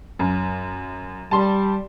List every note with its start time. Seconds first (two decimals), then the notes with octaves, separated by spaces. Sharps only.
0.19 F#2
1.31 G3 A5 C6